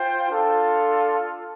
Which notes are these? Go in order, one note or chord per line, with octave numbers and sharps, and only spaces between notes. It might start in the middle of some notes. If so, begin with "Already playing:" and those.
Already playing: F4 C5 G5
D4 F4 A4